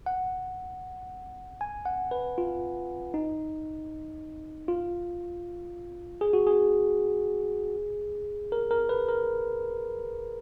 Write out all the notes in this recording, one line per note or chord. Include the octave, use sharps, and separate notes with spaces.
F#5
G#5
F#5
B4
F4
D#4
F4
G#4
F#4
G#4
A#4
A#4
B4
A#4